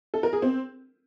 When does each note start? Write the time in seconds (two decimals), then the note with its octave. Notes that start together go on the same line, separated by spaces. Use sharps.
0.14 A4
0.23 A#4
0.33 G#4
0.42 C4